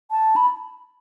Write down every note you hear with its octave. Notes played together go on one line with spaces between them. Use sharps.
A5
B5